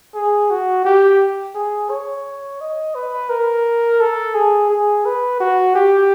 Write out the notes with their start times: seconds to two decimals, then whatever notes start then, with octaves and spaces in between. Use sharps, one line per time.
0.15 G#4
0.50 F#4
0.85 G4
1.55 G#4
1.90 C#5
2.61 D#5
2.95 B4
3.29 A#4
4.01 A4
4.34 G#4
4.70 G#4
5.06 B4
5.40 F#4
5.75 G4